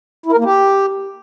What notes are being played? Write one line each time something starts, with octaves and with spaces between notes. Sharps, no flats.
E4
A#4
A#3
G4